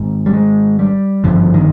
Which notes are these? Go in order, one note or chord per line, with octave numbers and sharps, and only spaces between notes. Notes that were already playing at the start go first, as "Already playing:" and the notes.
Already playing: G#1 G#2
G3
G#3
G3
G#1 G2 D3 F3
D#3